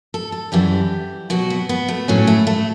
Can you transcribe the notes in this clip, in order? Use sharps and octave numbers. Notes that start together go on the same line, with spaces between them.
A4
A4
F#2 E3 G3 G4
B2 F#3 F#4
B3
B3
A3
A2 F#3 C#4
A3
A3